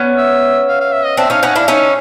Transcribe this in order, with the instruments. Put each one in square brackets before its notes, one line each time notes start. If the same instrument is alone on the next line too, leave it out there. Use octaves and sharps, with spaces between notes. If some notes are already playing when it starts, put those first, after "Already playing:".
Already playing: [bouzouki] B3 C#4
[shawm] E5
F5
F5
E5
D#5
[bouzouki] C4 D4 [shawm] E5
[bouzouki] C#4 D#4 [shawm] F5
[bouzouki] C#4 D#4 [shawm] F#5
[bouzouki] D4 E4 [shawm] F5
[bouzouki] C#4 D#4 [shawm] E5